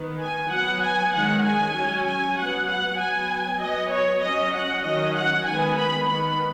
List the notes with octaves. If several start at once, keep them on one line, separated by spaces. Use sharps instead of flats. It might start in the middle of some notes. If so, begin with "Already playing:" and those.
Already playing: D#3 B3
G#5
F#3 B3 F#5
G#5
D#3 G#3 C#4 F#5
G#5
F#3 C#4
G#5
F#3 B3 F#5
F#5
F#3 B3 G#5
F#3 B3 D#5
C#5
F#3 C#4 D#5
F#5
D#3 F#3 C#4 D#5
F#5
D#3 G#3 B3 G#5
B5
D#3 B3 B5